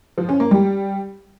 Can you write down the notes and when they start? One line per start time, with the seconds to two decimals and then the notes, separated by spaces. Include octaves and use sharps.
0.18 F3
0.29 C#4
0.40 A#3
0.51 G3